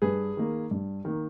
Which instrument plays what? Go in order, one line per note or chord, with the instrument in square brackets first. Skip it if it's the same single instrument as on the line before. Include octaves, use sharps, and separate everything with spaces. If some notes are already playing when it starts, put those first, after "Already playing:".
[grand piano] G2 G#4 B4
D#3 A#3
G2
D#3 A#3